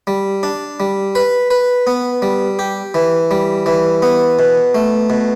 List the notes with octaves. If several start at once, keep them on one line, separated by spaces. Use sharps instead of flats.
G3
D4
G3
B4
B4
B3
G3
G4
E3
G3
E3
B3
B2
A3
B2